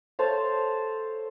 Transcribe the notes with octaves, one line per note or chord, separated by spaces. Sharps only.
A4 C5 C#5 F5